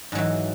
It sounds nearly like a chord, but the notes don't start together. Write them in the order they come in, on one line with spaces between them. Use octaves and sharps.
G#2 F#3 E3